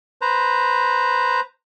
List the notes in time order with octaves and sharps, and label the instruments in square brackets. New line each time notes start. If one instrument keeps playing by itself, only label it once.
[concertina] B4 C5 A#5